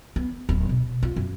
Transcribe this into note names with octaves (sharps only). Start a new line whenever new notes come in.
B3
D1
B2
F4
F#2